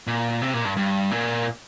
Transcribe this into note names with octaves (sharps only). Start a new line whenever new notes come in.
A#2
C3
A#2
G2
G2
A#2